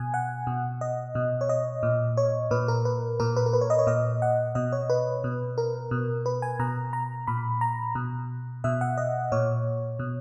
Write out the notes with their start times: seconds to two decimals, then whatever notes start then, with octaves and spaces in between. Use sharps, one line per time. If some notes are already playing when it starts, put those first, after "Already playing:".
Already playing: B2 G#5
0.14 F#5
0.47 B2
0.81 D#5
1.15 B2
1.41 C#5
1.49 D#5
1.83 A#2
2.17 C#5
2.51 A#2 B4
2.68 A#4
2.85 B4
3.20 A#2 A#4
3.36 B4
3.46 A#4
3.53 B4
3.61 C#5
3.70 D#5
3.79 C#5
3.87 A#2 D#5
4.22 F#5
4.55 B2 D#5
4.72 C#5
4.90 B4
5.24 B2
5.58 A#4
5.91 B2
6.26 B4
6.42 G#5
6.59 B2 A#5
6.93 A#5
7.27 A#2 B5
7.61 A#5
7.95 B2
8.64 B2 E5
8.81 F#5
8.97 D#5
9.32 A#2 C#5
9.99 B2